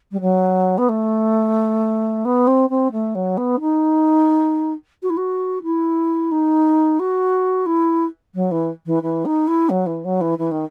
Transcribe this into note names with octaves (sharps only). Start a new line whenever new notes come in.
G3
F#3
B3
A3
B3
C4
C4
A3
F#3
B3
D#4
F#4
E4
F#4
E4
D#4
F#4
E4
F#3
E3
E3
E3
D#4
E4
F#3
E3
F#3
E3
E3
D#3